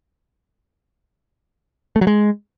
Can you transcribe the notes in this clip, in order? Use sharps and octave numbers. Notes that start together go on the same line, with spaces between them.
A3
F#3
G#3